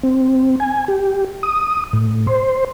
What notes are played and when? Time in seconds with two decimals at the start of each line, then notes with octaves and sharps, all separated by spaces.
0.04 C4
0.60 G#5
0.88 G4
1.43 D#6
1.93 A2
2.27 C5